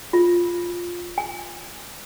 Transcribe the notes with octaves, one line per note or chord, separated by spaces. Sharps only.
F4
G#5